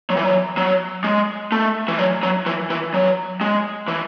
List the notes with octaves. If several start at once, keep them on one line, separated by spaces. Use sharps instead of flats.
F#3
E3
F#3
F#3
G#3
A3
E3
F#3
F#3
E3
E3
F#3
G#3
E3